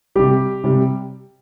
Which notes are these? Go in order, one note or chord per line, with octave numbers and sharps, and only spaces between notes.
C3 G3 G4
C3 G3